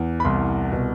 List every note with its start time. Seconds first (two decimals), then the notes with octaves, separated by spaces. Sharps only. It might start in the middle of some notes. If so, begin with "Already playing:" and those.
Already playing: E2
0.20 B5
0.25 C2 C6
0.72 B2